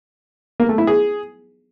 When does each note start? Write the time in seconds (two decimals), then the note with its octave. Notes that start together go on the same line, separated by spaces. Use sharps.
0.60 A#3
0.69 A3
0.78 E4
0.87 G#4